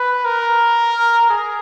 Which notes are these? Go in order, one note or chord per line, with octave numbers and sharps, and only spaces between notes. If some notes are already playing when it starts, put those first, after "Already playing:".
Already playing: B4
A#4
G#4